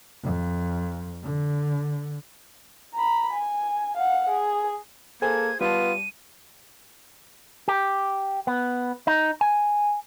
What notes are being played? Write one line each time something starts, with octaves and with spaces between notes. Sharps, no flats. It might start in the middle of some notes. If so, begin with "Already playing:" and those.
F2
D3
A#5 B5
G#5
F5 F#5
G#4
A#3 G#4 A4 C5 G#5 G#6
G3 B3 F4 A5 D#7
G4
B3
D#4
G#5